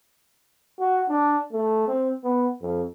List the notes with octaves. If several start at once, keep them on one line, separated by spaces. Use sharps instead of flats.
F#4
D4
A3
C4
B3
F2